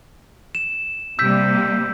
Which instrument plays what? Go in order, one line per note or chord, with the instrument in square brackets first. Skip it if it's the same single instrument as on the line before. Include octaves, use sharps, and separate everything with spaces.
[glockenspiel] E7
[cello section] C3 G3 A#3 [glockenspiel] E6 G6 B6